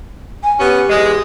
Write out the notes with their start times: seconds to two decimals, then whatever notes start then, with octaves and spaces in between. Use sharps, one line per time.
0.44 G#5
0.59 B3 C#4 G4
0.90 E2 G#3